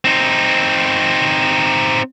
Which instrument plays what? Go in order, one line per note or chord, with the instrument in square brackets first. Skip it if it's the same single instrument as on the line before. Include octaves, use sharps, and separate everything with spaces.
[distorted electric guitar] C4 D#4